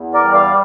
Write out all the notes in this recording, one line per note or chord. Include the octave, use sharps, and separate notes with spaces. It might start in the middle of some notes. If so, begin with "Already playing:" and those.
Already playing: E2
A#4 D5
G3
D5 F5